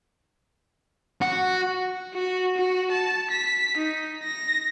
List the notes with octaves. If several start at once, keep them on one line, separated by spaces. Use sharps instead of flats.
F#4
F#4
F#4
A5
B6
D#4
A#6